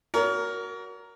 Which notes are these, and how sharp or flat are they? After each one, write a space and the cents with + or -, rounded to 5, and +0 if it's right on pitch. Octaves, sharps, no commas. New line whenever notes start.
F#4 +0 A#4 +5 C#5 +40